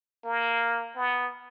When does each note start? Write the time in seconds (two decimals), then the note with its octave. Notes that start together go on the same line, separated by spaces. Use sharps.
0.25 A#3
0.96 B3